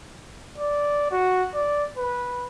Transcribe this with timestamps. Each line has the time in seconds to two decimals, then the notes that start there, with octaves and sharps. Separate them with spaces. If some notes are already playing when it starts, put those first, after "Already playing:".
0.58 D5
1.11 F#4
1.55 D5
1.98 B4